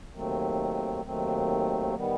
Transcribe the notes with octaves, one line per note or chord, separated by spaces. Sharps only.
D#2 D#3 F#3 A3 C4
D#2 D#3 F#3 A3 C4
D#3 G3 B3